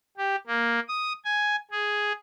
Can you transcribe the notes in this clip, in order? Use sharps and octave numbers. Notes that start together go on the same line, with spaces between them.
G4
A#3
D#6
G#5
G#4